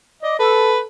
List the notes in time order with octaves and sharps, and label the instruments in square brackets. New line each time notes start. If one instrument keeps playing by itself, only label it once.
[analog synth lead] D5 [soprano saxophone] D#5
[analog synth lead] A4 [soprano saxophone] B4